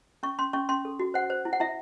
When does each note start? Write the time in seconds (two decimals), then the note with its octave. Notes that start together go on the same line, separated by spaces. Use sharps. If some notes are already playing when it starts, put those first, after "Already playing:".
0.23 C#4 C#6
0.39 C#4 C6
0.53 C#4 C#6
0.69 C#4 C6
0.85 A4
0.99 F#4
1.14 C5 F#5
1.30 C5
1.45 E4
1.53 F#5
1.60 E4 E5